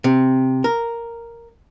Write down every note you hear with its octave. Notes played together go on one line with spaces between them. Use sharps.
C3
A#4